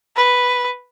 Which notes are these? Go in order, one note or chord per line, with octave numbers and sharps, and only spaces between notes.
B4